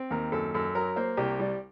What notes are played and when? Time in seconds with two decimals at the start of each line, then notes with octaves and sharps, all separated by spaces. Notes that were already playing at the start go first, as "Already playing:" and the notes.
Already playing: C4
0.10 D#2 A#4
0.32 F#2 A4
0.54 F#2 A4
0.75 F#3 A#4
0.96 A#3 C5
1.17 C2 G4
1.39 G3